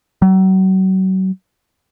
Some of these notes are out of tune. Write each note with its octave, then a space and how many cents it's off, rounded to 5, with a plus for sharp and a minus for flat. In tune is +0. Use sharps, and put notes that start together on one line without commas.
F#3 +35